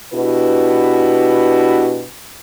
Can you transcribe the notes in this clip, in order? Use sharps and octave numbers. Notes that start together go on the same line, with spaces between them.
B2 D4 E4 F#4 G4 B4